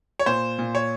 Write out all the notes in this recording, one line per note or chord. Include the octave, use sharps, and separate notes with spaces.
C#5
A#2 C5
A#2
C#5